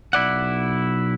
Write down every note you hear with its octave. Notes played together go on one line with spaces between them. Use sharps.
B1 E4 D5 F#5